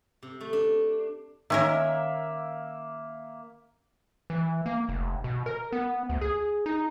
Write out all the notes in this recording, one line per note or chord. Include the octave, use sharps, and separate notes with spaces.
C3
A3
D4
D#3 A#3 C#4 A#4 E5
E3
A#3
F1
B2
A#4
B3
D2
G#4
D#4